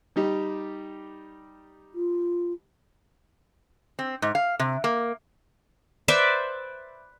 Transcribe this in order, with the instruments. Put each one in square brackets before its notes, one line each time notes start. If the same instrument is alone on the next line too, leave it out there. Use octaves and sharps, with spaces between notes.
[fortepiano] G3 D#4 G4
[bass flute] F4
[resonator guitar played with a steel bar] C4
G#2
F5
C3
A#3
[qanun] B4 C5 D5 E5